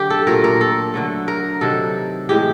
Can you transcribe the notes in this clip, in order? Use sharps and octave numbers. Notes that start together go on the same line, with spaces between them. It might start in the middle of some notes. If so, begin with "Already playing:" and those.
Already playing: D3 F#3 A3 G4
A4
A#2 F#3 A3 A#4
A#4
A4
D3 F#3 A3
A#4
C3 D#3 F#3 A4
A2 E3 G#3 G4